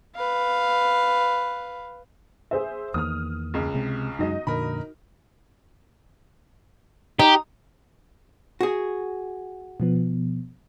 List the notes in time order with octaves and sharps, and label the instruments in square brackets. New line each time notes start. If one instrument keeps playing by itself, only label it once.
[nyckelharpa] B4 F5
[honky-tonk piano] G#4 C5 E5
[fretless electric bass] E2 D#3 A#3 [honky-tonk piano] D#6 F6
[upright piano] C#2 C#3
[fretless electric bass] C3 G#3
[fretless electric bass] F#2 G#3 [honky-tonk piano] D#4 F#4 D#5
[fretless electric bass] F2 A#2 D3 [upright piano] A#4 B5
[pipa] D#4 [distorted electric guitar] G4
[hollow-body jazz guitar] F#4 G#4
[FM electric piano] B2 F3 B3